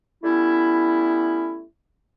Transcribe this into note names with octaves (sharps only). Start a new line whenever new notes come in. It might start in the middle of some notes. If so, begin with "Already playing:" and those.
G3 A3 B3 C#4 E4